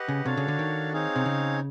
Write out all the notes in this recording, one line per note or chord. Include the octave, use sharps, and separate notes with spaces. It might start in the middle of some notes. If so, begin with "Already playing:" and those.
Already playing: G4 B4 D#5 F#5
C#3
C3 D4 F#4 A4 C#5 F5
C#3
D3
D#3
C4 D#4 G#4 C#5 F5
C3
C#3